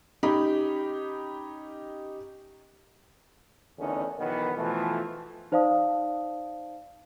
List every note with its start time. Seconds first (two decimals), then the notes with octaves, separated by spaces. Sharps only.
0.23 C#4 D#4 G4 B5
3.78 E2 D3 D#3 A3 C#4 D#4
4.19 B1 D#3 E3 B3
4.57 B2 E3 F3 A3
5.52 D#4 C5 D5 F5 A5 D#6